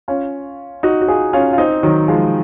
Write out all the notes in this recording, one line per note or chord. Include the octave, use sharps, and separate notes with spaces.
C#4 F4
D#4 F#4
F#4
F4 G#4
C#4 F4
F4
C4 D#4
D#3 F#3
F3 G#3